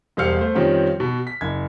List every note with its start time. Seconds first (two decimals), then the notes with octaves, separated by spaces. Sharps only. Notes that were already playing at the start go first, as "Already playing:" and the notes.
0.17 E1 G3 C5 F5 F6 C#7
0.39 A3 C5
0.55 F2 D#3 F3 G3 C4 C#4
1.00 B2
1.27 B6
1.41 F#1 G#6